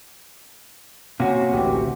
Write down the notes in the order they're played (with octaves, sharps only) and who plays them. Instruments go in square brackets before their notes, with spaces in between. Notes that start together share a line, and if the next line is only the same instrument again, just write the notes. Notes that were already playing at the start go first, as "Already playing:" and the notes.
[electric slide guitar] C3 F#4 [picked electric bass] A#3 [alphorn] C#4
[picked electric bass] A1 D2 E3 [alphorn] G4